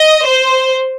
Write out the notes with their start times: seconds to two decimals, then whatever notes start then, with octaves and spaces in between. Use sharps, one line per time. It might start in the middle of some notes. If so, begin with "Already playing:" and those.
Already playing: D#5
0.26 C5